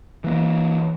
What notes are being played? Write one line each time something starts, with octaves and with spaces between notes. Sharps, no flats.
E3 A#3